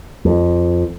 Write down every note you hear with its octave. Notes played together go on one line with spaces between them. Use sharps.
F2